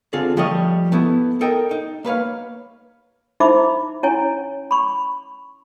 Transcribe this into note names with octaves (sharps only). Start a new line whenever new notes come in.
D3 C4 F4 G#4 A4
F3 G3 A3 G4 C#5 D#5
A3 B3 E4
A4 A#4 D#5 G5
D#4
A#3 B4 C#5 F5
D#4 E4 C5 E5 B5 D6
C#4 E4 C#5 G#5
B5 C#6